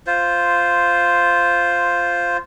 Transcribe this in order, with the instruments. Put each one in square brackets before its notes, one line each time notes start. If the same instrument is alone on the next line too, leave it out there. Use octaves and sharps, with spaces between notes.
[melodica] F4 C5